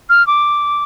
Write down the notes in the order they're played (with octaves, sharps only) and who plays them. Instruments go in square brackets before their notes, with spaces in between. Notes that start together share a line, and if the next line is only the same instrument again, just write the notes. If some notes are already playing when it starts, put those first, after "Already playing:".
[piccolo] F6
D6